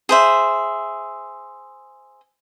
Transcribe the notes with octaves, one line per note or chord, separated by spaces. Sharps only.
G#4 C5 E5